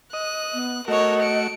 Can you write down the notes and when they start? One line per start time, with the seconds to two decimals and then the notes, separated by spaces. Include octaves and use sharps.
0.13 D#5 F#6
0.54 B3
0.88 A3 F#4 A#4 C#5 D#5
1.22 C#7 D7